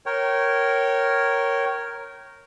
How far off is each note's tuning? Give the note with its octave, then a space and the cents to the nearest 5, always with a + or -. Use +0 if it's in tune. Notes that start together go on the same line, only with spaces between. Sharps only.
A#4 +0 C#5 -10 G5 -25